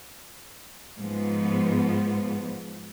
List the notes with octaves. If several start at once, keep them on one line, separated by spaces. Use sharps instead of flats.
G#2 F3 B3